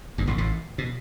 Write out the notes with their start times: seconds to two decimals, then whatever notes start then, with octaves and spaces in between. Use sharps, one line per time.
0.18 G1 G2
0.27 A1 A2
0.38 A1 A2
0.78 B2